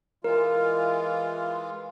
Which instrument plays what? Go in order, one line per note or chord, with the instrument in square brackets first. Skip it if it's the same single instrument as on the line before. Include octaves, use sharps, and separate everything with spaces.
[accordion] E3 G#3 F4 [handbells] A#4